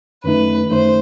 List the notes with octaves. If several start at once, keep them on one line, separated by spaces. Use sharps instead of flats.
F#2 D#3 A3 D#4 B4
F#2 D#3 A3 D#4 C5